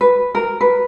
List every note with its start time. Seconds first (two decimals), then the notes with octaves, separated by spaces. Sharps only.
0.01 B4
0.35 A#4
0.61 B4